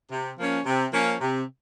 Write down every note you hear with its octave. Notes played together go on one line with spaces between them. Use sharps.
C3
F3 A#3 C#4
C3
F3 A#3 C#4
C3